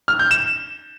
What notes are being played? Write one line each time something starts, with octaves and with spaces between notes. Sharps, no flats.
F6
G6
E7